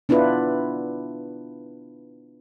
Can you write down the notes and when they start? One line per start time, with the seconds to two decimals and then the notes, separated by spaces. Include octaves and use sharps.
0.09 B3 D4 E4 F4 B4